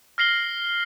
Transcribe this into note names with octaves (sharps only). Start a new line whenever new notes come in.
F6 A#6 C7 F#7 G7